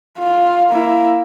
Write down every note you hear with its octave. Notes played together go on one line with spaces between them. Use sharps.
F4
A#3 E4